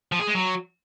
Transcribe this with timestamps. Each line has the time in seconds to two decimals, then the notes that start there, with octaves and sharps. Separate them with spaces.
0.12 F3
0.20 G#4
0.27 G#3
0.35 F#3